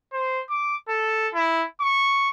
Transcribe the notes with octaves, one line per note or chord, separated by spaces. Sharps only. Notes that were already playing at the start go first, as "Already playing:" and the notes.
C5
D6
A4
E4
C#6